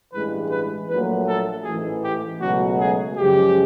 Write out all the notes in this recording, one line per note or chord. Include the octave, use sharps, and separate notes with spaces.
A1 G2 E3 G#3 B4
B4
A#1 A#2 F#3 A3 B4
A4
A1 G#2 E3 A3 G#4
G4
C#2 B2 F#3 A3 F#4
G#4
F#2 C#3 F3 G#3 G4